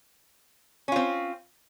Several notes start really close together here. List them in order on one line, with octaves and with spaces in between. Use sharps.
C#4 F4 C4